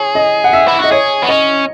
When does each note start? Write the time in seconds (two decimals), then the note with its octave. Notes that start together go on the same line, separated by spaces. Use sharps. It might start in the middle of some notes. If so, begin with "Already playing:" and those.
Already playing: G#4 C#5
0.15 D#5
0.44 F#5
0.53 E5
0.68 E4
0.79 F#4 D#5
0.91 G#4 C#5
1.23 B3
1.29 C#4 D#5